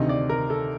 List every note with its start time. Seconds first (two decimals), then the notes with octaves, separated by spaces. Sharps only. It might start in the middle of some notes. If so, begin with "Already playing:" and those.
Already playing: D2 C3 D#3 D#5
0.09 D5
0.29 A#4
0.50 A4